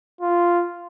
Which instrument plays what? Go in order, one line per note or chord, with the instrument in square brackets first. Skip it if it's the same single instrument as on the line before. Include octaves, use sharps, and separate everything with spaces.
[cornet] F4